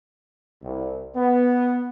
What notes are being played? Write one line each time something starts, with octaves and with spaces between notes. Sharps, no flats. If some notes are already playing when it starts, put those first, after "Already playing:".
C2
B3